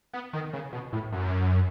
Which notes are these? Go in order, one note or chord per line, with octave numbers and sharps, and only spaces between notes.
B3
D#3
C#3
B2
A2
F#2